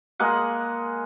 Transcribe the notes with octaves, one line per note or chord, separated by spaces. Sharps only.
G#3 A#3 G#4 F#5